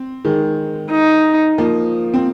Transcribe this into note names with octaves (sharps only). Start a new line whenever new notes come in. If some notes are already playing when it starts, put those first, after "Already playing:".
Already playing: C4
D#3 G#3
D#4
F3 A#3
C4